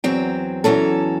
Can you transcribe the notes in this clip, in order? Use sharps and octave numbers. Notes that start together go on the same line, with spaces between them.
E2 F#3 C4 G5
E2 E3 F#3 C#4 A4